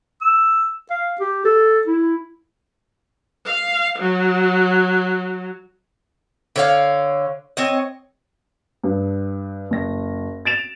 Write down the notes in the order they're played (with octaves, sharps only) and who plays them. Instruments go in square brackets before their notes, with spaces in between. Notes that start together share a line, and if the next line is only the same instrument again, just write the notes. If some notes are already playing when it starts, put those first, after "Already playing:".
[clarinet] E6
F5
G4
A4
E4
[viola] F5
F#3
[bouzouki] D3 C#5 F5
C4 C#5 D#5
[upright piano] G2
F#1 A#6
A6 D7 E7 F7